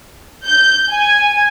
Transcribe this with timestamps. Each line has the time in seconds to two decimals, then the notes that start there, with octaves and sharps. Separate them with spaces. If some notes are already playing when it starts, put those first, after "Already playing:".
0.44 G6
0.92 G#5